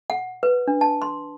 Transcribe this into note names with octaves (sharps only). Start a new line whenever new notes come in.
F#5
B4
D4
A5
C6